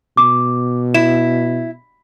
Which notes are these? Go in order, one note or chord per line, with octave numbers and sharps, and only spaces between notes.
B2 D6
E4 E7